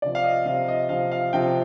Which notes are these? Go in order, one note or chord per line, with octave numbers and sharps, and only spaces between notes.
C3 F3 D5
F5
D#5
C3 F3 F5
D#5
C3 F3 F5
F5
C3 F3 G5